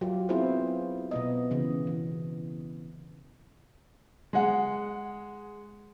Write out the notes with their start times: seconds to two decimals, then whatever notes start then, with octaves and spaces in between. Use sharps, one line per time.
0.01 F#3 F4 G4
0.29 B3 C4 E4 F4 G#4 C5
1.11 B2 B3 D#5
1.51 C#3 E3
1.87 E3
4.33 G#3 G#4 F#5